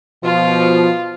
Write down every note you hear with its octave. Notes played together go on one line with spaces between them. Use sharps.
B2 F3 F4